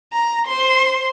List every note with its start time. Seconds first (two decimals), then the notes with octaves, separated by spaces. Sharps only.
0.12 A#5
0.47 C5 C6